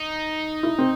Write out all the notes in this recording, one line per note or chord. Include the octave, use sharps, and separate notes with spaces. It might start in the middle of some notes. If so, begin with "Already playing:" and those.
Already playing: D#4
E4
C4